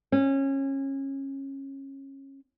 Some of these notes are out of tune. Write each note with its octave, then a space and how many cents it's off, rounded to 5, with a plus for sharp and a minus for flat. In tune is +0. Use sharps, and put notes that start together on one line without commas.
C#4 -25